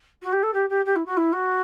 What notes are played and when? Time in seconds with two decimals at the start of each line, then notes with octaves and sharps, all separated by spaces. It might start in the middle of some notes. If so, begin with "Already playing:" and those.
0.22 F#4
0.33 G4
0.43 A4
0.54 G4
0.70 G4
0.86 G4
0.96 E4
1.06 F#4
1.17 E4
1.33 F#4